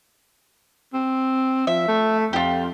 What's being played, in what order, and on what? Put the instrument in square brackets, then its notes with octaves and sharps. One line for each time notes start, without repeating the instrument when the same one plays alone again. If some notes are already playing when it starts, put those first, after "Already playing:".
[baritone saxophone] C4
[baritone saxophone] F3 [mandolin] E5
[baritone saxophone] A3
[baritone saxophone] F2 [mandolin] F4 G4